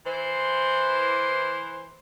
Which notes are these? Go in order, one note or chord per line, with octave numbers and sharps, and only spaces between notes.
E3 C5